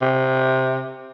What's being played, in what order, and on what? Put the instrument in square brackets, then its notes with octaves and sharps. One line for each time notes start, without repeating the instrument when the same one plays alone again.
[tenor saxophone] C3